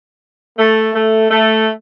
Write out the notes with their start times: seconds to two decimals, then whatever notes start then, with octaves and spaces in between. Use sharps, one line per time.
0.58 A3
0.94 A3
1.31 A3